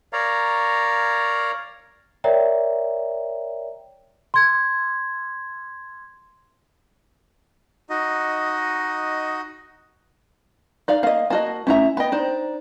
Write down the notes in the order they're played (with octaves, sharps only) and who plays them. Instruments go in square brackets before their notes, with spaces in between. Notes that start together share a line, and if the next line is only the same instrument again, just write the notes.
[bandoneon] A#4 C#5 D5 F5 A#5
[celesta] A#4 C#5 D5 E5 G5 A#5
C6 G#6
[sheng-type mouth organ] D#4 F#4 D#5
[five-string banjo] D#4 D5 F5
[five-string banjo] A#3 [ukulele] D#5 F5
[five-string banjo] A#3 F#4 D#5 [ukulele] A5
[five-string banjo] A3 E4 A#5 [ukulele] C#4 E5
[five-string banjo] B3 D#5 [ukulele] G5 B5
[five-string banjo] D4 C5 [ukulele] D#4